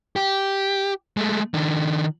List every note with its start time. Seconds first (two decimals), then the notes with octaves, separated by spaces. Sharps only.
0.16 G4
1.17 G#3 A3
1.54 D#3 D4